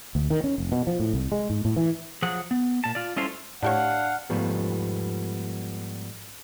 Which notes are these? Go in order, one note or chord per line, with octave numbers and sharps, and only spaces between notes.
D2
D#3
C#4
F1
B2
F3
A2
C2
G#3
G#2
A2
E3
F3 F#3 G#4 F#5
B3
A#2 A5
F4 D5
G3 C#4 E4 F4 A4 C5
A2 D4 G4 C#5 F5 F#5
G#2 F3 G3 A3 B3